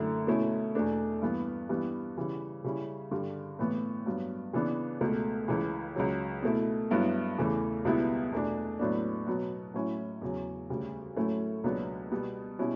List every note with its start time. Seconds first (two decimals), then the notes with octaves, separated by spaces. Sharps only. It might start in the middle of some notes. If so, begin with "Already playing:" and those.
Already playing: F#2 D3 A3 E4
0.27 B2 A3 C#4 E4
0.75 E2 B2 A3 D4
1.22 G2 E3 B3
1.69 G2 E3 G3 B3
2.17 C#3 E3 G3
2.64 C#3 G3 C#4 E4
3.11 G2 D3 G3
3.59 A2 E3 B3
4.06 G2 F#3 B3
4.53 C#3 E3 B3 D4
5.01 C#2 B2 A3
5.48 C#2 C#3 E3
5.96 C#2 C#3 F#3
6.43 B2 A3 E4
6.91 G2 F#3 B3 E4
7.38 E2 C#3 E3 A3
7.85 C#2 B2 G3 B3 E4
8.32 E2 B2 A3 D4
8.79 A2 F#3 B3 D4
9.27 B2 F#3 B3
9.74 A2 F#3 C#4 E4
10.22 E2 C#3 F#3
10.70 D2 C#3 G3
11.16 A2 F#3 A3 C#4 E4
11.64 C#2 B2 F#3 B3 D4
12.12 B2 G3 B3
12.59 B2 G3 C#4 E4